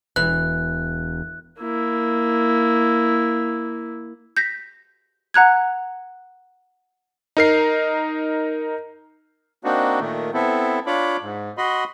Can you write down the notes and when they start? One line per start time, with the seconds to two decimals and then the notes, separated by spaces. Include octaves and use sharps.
0.16 E1 E3 F#6
1.60 A#3 E4
4.37 G6 A#6 B6
5.34 F#5 A#5 F#6 G#6
7.37 D#4 A#4 C7
9.64 A#3 C4 D4 D#4 F#4
10.00 A#2 D#3 A3
10.34 B3 C4 E4 A4
10.87 D4 F4 C#5 B5 D6
11.21 G#2
11.58 F#4 D#5 B5 C6